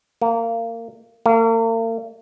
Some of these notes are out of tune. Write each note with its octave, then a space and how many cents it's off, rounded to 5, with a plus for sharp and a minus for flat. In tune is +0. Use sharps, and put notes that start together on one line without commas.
A#3 -25
A#3 -45